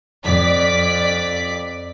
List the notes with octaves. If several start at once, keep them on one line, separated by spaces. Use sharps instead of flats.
F2 D5 B6